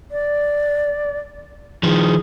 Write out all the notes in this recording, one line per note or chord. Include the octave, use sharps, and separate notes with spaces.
D5
D#3 F3 G#4